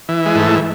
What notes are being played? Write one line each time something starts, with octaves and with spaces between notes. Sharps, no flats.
E3
G#3
G#2 A3